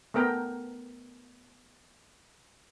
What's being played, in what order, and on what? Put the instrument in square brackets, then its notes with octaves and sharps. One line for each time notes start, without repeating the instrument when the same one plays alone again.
[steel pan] A3 B3 A#4 G5